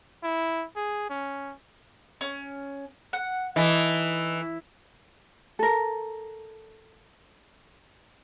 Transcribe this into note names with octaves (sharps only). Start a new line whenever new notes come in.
E4
G#4
C#4
C#4
F#5
E3 D#4 E4 A4
A4 A#4